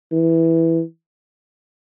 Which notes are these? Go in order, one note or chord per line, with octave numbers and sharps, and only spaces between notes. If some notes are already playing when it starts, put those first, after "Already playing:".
E3